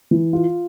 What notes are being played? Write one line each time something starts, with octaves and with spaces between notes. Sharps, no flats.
E3
F4